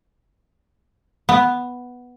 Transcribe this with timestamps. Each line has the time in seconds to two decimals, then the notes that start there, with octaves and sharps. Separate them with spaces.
1.29 B3